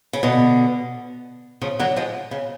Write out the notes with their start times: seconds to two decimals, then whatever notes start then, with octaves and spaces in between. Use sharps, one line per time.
0.13 C#3
0.23 B2 D3
1.62 C#3 F3
1.79 D3 F#3
1.96 F3 G#3
2.31 C#3